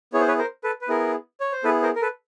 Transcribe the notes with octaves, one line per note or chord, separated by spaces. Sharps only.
B3 E4 G#4 C#5
C5
B4 C#5
A#4 C5
A4 B4
B4
B3 E4 G#4 A#4
C#5
C5
B3 E4 G#4 A4 B4
A#4 C5
A#4
A4 B4